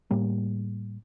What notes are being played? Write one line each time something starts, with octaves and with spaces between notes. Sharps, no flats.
A2 G3 A#3